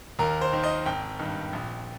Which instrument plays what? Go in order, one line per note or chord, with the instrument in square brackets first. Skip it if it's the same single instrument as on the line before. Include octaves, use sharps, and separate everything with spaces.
[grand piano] D#2 A#4
C5
D#3
D#5
G#1 G5
G2 D#3
A#1